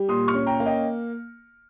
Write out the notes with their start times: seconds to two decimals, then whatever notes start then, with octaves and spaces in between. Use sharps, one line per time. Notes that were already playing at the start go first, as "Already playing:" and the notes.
Already playing: G3
0.09 A#2 C6 D#6
0.28 C#6 F6
0.34 C#4
0.47 G5 A#5
0.60 A#3
0.66 D#5 G5